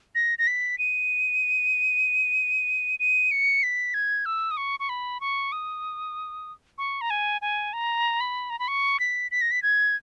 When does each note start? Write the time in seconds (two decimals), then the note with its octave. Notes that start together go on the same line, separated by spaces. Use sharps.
0.15 A#6
0.38 A#6
0.47 B6
0.78 D#7
2.99 D#7
3.31 C#7
3.63 B6
3.94 G#6
4.25 E6
4.51 D#6
4.57 C#6
4.80 C#6
4.89 B5
5.20 C#6
5.52 D#6
6.78 C#6
7.01 A#5
7.10 G#5
7.41 G#5
7.73 A#5
8.20 B5
8.50 A#5
8.59 B5
8.68 C#6
9.00 B6
9.31 B6
9.41 A#6
9.51 B6
9.62 G#6